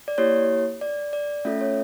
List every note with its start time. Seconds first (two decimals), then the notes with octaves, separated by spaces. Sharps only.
0.08 D5
0.18 A#3 E4 G4 C#5
0.81 D5
1.13 D5
1.45 A3 C#4 F4 A4 E5
1.61 C#5